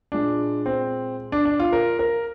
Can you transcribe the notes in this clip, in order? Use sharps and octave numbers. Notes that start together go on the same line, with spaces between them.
A#2 G#3 D4
C4
D4
D4
F4
A#4
A#4